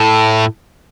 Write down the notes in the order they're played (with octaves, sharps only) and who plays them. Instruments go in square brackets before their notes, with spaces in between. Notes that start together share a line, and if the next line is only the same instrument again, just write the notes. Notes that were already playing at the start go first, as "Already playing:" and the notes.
Already playing: [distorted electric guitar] A2